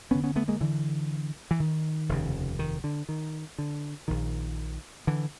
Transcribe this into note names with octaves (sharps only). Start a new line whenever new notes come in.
F1 F2 D3 B3 C#4
B3 C#4
A3 B3
G#3 A#3
D3 E3
E3
D#3
F1 D#2 C#3
D#3
D3
D#3
D3
A#1 A#2 D#3
D3 E3